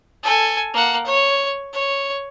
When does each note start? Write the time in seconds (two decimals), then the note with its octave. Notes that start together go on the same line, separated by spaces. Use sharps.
0.23 A4 G#5
0.74 A#3 F#5
1.06 C#5
1.73 C#5